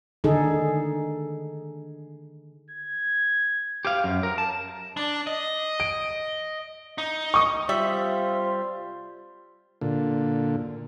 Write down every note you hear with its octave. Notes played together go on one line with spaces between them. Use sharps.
D3 D#3 D#4 G#4 A4
G#6
G4 F5
F#2
A#4
A5
D4
D#5
D7
D#4
C#6 D#6
C3 G3 F4 C5 E5
A#2 D3